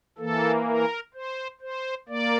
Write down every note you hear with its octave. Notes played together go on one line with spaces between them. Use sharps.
E3 A#3 A4
A#4
C5
C5
A#3 D5